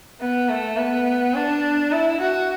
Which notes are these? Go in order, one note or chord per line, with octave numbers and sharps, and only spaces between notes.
B3
A3
B3
D4
E4
F#4